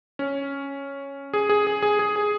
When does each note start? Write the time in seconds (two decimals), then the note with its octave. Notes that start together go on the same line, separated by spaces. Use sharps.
0.19 C#4
1.33 G#4
1.49 G#4
1.67 G#4
1.82 G#4
1.99 G#4
2.16 G#4